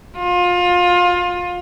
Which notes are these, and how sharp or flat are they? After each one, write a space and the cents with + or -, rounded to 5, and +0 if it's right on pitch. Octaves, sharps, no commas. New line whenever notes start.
F4 +25